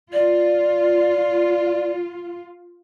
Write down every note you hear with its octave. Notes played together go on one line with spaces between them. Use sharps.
F4 D5